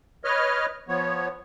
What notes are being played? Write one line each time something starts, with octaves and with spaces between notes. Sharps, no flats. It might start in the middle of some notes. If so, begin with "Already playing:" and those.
B4 C#5 D#5 F6
F3 B3 C#5